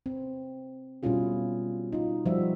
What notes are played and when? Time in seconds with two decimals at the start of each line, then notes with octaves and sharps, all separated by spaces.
0.06 C4
1.03 B2 G3 C#4 E4 F4 G#4
1.93 D#4 F4
2.26 F3 G3 F#4 E5